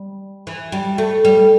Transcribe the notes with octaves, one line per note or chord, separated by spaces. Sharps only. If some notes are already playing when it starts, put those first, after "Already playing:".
Already playing: G3
E3
G3
A3
G3